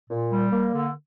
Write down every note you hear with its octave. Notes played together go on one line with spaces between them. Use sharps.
A#2
G3
A#3
D3